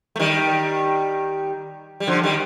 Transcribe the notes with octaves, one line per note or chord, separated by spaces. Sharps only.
A3
D#3 G3
G3
D3 F3
D#3 G3